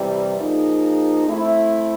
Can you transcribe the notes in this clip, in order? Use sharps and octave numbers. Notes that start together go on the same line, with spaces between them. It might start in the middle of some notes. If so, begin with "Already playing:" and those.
Already playing: C3 E3 G3
F3 A#3 D#4 G#4
A3 C4 E4